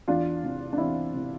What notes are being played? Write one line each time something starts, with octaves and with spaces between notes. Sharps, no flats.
E2 D4 F4
C3 E3
D4
E2 C4 E4
C3 E3